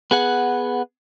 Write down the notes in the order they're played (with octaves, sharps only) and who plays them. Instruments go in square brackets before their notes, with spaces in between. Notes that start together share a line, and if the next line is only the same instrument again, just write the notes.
[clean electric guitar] B3 G#4 F#5